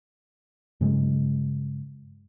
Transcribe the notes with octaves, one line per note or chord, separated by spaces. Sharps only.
G2 C#3 F#3 G#3